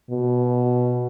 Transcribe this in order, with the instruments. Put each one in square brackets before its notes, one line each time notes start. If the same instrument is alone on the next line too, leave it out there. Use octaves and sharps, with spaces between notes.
[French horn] B2